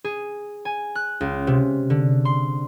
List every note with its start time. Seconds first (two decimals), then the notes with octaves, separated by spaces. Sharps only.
0.04 G#4
0.65 G#5
0.95 F#6
1.21 C#2
1.47 C3
1.90 D3
2.25 C6